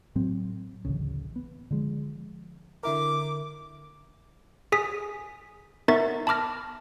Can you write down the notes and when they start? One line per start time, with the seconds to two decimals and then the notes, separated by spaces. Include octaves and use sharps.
0.15 A2 F#3 C4
0.85 A1 D2 C#3
1.36 B3
1.71 D3 F3 G#3
2.83 D3 E4 A#4 D6
4.72 G#4 G#5 D#6 B6
5.88 B3 D#4 A#4 E5 C#6 A6
6.27 A5 B5 D6 F6 A#6